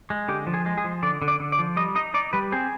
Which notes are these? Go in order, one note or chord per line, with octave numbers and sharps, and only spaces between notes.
G#3
D3 G4
F3
G#4
G#3
G#4
F3
D3 D5
D3
D5
D3
D5
F3
G3 D#5
D#4 D#5
D#4 D5
G3 B4
C4 G#4